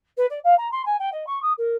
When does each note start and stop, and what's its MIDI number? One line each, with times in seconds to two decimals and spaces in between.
0.17 0.26 71
0.29 0.39 74
0.44 0.54 77
0.57 0.70 82
0.71 0.84 84
0.85 0.96 80
0.99 1.09 79
1.12 1.26 75
1.26 1.41 85
1.42 1.52 87
1.57 1.76 70